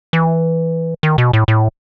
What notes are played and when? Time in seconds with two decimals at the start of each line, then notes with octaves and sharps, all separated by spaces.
0.13 E3
1.03 D#3
1.18 B2
1.33 A2
1.48 A2